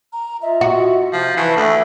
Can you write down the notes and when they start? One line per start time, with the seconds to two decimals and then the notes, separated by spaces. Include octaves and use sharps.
0.13 A#5
0.41 F4 D#5 E5
0.61 F#4
1.13 C3 F3
1.37 E3 B4 A5 C#6
1.56 D2 A4 E5